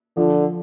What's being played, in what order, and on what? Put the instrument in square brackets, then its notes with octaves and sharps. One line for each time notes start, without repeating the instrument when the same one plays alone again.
[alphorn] D3 [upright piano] F3